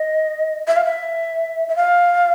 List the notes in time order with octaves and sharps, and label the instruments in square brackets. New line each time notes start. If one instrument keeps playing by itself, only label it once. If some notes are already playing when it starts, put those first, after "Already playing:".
Already playing: [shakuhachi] D#5
E5
F5
E5
E5
F5